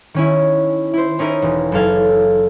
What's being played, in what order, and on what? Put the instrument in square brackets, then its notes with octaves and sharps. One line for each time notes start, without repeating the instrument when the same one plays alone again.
[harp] D#3 C#4 E4
E4 C5
C#4 D#4 E4 A#4 D#5
E1
F#1 A4 F5 G#6